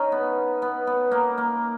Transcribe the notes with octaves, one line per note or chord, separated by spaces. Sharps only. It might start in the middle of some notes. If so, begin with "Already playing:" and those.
Already playing: C#4 D#4
B3
B3
B3
A#3
A#3